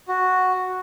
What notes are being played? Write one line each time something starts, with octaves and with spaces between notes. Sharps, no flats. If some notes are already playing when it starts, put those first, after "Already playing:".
F#4